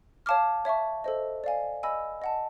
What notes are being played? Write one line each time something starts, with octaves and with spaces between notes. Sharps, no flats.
C#5 F5 A5 D6 F6
C#5 E5 A5 C#6
A4 C5 D#5
D5 F5 G#5
D#5 G#5 B5 E6
D#5 F#5 A5